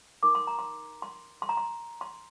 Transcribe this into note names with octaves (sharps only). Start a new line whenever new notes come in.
D#4 A#4 D6
C6
A#5
C6
C6
C6
A#5
C6
C6